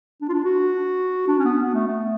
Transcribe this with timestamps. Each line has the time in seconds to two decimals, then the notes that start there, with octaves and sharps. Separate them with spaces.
0.22 D4
0.29 F4
0.34 D4
0.44 F#4
1.28 D4
1.39 C#4
1.45 B3
1.63 B3
1.74 A3
1.87 A3